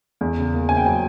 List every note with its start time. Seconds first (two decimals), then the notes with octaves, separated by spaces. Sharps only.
0.21 E2
0.38 C#3
0.54 A#3
0.69 C#3 G#5
0.77 G5
0.86 F#3 G#5